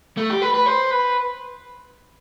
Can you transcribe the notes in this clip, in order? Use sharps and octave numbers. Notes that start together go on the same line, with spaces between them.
A3
G4
B4
B4
C5
B4